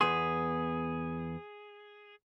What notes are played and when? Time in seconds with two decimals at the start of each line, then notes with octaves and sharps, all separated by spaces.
0.01 E2 B3 G#4 C6